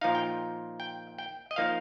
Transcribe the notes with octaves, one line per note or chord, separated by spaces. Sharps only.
A#2 F3 D#4 F5
G5
G5
G5
D#5
F3 A#3 D#4 F5